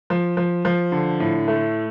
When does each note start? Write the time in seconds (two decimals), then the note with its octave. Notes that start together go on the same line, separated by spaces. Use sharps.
0.10 F3
0.37 F3
0.65 F3
0.92 D3
1.20 A2
1.48 A3